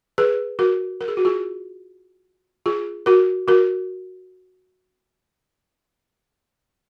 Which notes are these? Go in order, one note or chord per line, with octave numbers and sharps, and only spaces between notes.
G#4 B4
F#4 A#4
A#4
G#4
F#4
F4 G#4
F4 G#4
F#4 A#4
F#4 A#4